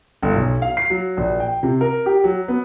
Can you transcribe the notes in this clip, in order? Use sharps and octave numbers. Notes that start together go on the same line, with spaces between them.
G1
B1
F5
C7
F#3
A#1
G5
C3
A#4
G4
F#3
B3